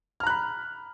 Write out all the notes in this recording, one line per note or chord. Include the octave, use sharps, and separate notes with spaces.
A#5 B5 F6 F#6